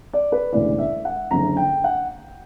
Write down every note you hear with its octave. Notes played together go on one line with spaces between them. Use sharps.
D5
B4
E1 D2 C#3 E3 D5
E5
F#5
F#1 F#2 D3 A#5
G5
F#5